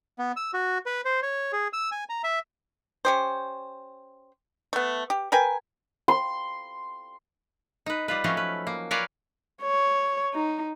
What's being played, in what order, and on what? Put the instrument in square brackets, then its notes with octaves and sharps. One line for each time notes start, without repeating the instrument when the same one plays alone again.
[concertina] B3
E6
F#4
B4
C5
C#5
G#4
E6
G#5
A#5
E5
[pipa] C#4 G4 C5
A3 B3
G4
A#4 B4 G5 G#5
[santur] C6
[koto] D#4 B4
G3 F4 B4
F3 F#3 A3 C4 C#4
B4
A#3
A#4 B4 C#5 D5 F5 G#5
[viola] C#5
D#4